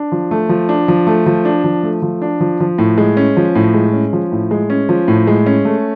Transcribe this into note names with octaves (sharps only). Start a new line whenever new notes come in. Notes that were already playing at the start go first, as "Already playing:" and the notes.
Already playing: D4
F3
A3
F3
D4
F3
A3
F3
D4
F3
A3
F3
D4
F3
F3
A2
G#3
C#4
F3
A2
G#3
C#4
F3
A2
G#3
C#4
F3
A2
G#3
C#4
A3